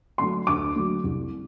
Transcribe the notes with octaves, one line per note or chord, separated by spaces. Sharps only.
D3 F#3 A3 D4 C6
D2 D6
D3 F#3 A3 D4
C2